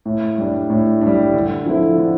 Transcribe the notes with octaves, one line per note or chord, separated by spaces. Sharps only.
A2
G3 D4
A2
G3 D4
D3
F3 C4 E4 A4
D3